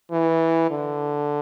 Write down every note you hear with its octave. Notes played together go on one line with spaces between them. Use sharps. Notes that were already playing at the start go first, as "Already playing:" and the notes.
E3
D3